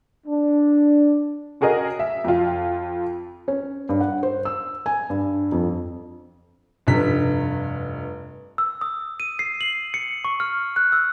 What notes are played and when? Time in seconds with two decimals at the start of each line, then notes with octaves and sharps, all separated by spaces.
0.27 D4
1.61 C#4 F#4 G#4 A#4 D#5
1.99 E5
2.24 F2 F4
3.48 C#4
3.89 G2
4.00 F#5
4.23 C5
4.45 E6
4.86 G#5
5.10 G2
5.52 F2
6.87 F1 G2 B6
8.58 E6
8.81 D#6
9.20 D#7
9.39 C7
9.61 F#7
9.94 C#7
10.25 C#6
10.40 F6
10.76 F#6
10.92 E6